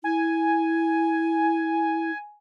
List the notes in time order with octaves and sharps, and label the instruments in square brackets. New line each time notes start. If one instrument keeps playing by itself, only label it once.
[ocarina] E4 [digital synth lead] G#5